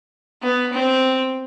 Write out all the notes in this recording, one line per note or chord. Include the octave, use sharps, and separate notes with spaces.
B3
C4